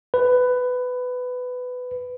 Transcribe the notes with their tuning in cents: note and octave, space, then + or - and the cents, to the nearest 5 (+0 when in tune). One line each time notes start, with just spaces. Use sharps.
B4 +15